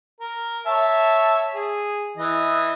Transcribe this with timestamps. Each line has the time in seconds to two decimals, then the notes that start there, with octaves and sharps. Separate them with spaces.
0.20 A#4
0.66 C#5 E5 A5
1.54 G#4
2.17 E3 E4 D#5